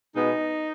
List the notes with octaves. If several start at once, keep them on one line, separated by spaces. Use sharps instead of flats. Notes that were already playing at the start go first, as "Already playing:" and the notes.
B2 G#3 B3 D#4